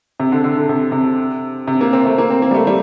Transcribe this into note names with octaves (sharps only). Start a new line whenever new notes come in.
C3
D3
D3
D3
C3
C3
C3
A#3
C4
A3
A#3
C4
A#3
G3
A3
G3